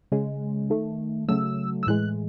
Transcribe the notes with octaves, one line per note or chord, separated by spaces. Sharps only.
C#3 G#3
D#3 A3
C#3 F#3 A3 E6
E6
A2 E3 G#3 F#6